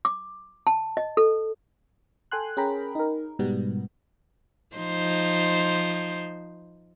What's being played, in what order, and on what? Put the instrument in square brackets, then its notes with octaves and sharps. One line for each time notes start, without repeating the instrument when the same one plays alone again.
[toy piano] D6
A5
D#5
A4
[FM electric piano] A4 G5 G#5 C6 F#6
C#4 G#4 A#4 G5 A#5 B5
D#4 A#4
G#2 B2 G3 B3
[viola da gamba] F3 D#4 C5